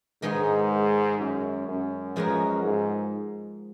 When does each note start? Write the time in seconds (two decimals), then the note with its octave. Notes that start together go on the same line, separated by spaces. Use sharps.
0.22 G#2 D#3 G#3 B3 D#4
1.19 F#2
1.68 F#2
2.16 F3 G#3 B3 F#4 A#4
2.64 G#2